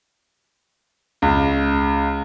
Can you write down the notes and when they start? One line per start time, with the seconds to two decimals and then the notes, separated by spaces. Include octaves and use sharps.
1.22 C#2